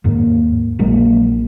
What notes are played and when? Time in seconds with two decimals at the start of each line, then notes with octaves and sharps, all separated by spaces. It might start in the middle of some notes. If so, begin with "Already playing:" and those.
0.04 D#2 G#2 A#3
0.79 A#1 F#3 G#3 A#3